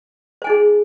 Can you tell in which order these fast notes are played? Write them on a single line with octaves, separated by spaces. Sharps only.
C5 G#5 D#4 G#4